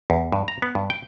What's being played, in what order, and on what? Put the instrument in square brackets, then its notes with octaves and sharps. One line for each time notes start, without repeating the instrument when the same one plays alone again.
[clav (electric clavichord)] E2
G2
A#5
B3
G2
G5